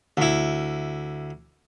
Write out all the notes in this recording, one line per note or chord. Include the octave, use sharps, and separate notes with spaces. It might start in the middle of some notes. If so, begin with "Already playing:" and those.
D2 E4